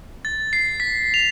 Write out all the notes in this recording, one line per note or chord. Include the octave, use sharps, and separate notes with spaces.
A6
C7
B6
F7